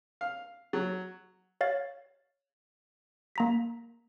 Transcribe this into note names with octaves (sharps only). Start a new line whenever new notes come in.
F5
F#3
C#5 F5 A6
A#3 A#5 B6